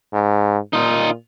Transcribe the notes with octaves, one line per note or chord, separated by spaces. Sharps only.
G#2
A#2 D#4 F4